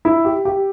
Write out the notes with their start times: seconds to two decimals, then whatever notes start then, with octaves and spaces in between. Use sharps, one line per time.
0.05 E4
0.25 G4
0.45 G4